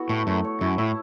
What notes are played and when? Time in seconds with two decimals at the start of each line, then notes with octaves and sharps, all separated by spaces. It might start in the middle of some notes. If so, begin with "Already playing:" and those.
Already playing: B3 E4 F#4 A4
0.09 A2 A3
0.27 F#2 A3
0.44 C#5
0.61 F#2 E4
0.78 A2 E4